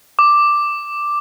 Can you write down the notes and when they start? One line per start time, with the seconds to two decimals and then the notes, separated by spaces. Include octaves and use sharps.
0.19 D6